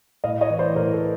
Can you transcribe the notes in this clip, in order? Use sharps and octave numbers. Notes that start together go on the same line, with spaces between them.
A2 D#5 F5
C#5 D#5
E3
C5 D5
A2 A#4 C5
A4 B4